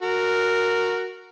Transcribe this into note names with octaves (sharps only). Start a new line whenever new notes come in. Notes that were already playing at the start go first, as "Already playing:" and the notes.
F#4 A#4